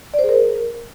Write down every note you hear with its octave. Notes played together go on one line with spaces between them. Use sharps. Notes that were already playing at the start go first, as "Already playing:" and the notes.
D5
C5
G#4
A#4